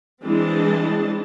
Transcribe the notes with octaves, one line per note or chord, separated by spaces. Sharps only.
E3 G#3 C4 D4 D#5 A5